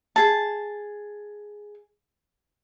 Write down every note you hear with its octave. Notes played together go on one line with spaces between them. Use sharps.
G#4 A5